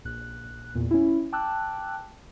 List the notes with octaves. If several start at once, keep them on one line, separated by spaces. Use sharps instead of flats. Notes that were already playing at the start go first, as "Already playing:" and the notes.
A#1 F#6
E2 A#2
C#4 E4
G5 A5 D6 E6 F#6